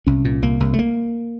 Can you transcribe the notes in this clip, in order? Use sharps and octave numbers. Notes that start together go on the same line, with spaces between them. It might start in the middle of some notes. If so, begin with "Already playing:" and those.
C2 C#4
A#2
C2 A#3
C2
A3
A#3